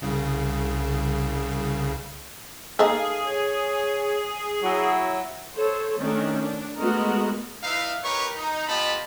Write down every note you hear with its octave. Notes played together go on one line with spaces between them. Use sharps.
C2 C#3
A#3 D#4 G#4 A4 F5
C#5
F#3 E4 F#4
A4 C5 C#5
D#3 A3 C#4 D4
D4
G#3 A3 B3 F#4 A#4 D#5
D#4 E4 B4 E5 F5
D#4 G4 A#4 B4 C#5 C#6
D#4
B3 F4 G4 D#5 A5 B5